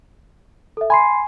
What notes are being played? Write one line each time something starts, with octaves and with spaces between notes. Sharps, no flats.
A4 E5
G#5 B5 C6 C7